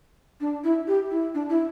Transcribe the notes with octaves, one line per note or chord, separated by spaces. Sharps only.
D4
E4
G4
E4
D4
E4